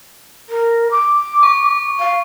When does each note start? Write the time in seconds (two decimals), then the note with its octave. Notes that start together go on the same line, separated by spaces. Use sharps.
0.49 A#4
0.91 D6
1.43 C#6
1.99 F5